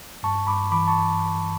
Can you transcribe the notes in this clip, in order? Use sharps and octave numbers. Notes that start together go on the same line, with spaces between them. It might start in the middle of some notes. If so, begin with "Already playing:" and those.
G2 A5 C#6
G2 B5 D6
E3 B5 D6
A5 C#6